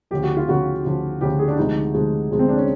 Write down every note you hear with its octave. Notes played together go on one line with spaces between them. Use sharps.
D2 C#3 F3 G4
F#4
F4
D2 C#3 F3 F#4
D2 C#3 F3
D2 C#3 F3 G4
G#4
D4
D2 C3 F3 G#3 D#4
D2 C3 F3 G#3
D2 C3 F3 G#3
C4
D4
C#4